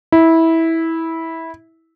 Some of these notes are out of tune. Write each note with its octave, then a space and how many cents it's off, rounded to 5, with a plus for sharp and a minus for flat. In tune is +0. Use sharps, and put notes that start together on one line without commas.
E4 -15